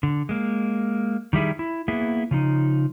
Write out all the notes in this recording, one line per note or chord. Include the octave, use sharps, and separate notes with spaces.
D3
G#3 A#3
D#3 G3 E4 G#4
E4
A#3 B3 E4 G#4
C#3 F3 D#4